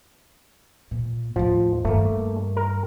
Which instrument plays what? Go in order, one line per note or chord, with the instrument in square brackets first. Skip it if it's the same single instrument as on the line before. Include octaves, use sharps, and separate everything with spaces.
[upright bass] A#2
[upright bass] D#2 A2 [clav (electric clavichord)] F3
[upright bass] G2 D#3 [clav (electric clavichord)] A3 A#3
[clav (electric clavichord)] A#4